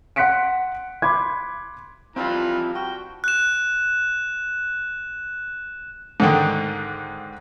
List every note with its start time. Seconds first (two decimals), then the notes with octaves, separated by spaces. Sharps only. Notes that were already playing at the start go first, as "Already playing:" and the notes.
0.16 F#5 C6 F#6 B6 C#7 D7
1.02 B5 C6 D6 G#6
2.16 E3 F3 G3 C4 F4 A#4 B5
2.75 F#4 G5
3.24 F#6 E7
6.20 G#2 D3 D#3